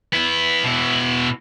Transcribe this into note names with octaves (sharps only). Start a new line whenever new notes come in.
B3 E4
B2 E4